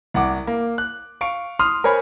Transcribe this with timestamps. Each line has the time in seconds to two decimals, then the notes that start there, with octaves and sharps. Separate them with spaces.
0.14 C2 F#5 D6
0.47 A#3
0.78 F#6
1.21 F5 C#6 D7
1.59 C6 D#6 F6
1.84 A#4 C5 C#5 G#5 B5